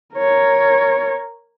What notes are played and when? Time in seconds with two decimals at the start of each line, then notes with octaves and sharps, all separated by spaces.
0.15 A#4 C#5